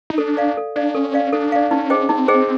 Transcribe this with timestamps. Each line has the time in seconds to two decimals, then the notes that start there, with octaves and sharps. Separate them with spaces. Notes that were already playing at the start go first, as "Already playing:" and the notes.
0.10 D#4
0.18 D4 A4
0.37 D5 F5
0.57 A4
0.76 D4 D5 F5
0.95 C#4 A4
1.14 D5 F5
1.33 D4 A4
1.52 D5 F5
1.71 C#4 D#4
1.90 G#4 C5 D#5 G5
2.09 C4 D#4
2.28 G#4 C5 D#5 G5